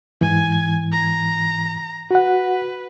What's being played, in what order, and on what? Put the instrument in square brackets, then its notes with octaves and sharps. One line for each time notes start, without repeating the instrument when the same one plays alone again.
[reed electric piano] G#2 E3 [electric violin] G#5 G#6
[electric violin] A#5
[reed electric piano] F#4 F#5 [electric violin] B4